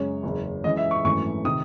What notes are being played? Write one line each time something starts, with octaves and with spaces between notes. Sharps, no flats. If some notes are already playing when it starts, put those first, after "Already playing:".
Already playing: F#2 C#3 G#3 C#5
F#1 E2 C#3
F#2 E3 G#3 D#5
E5
C#6
G#1 F#2 E3 A3 C#6
C3 D#3 D#6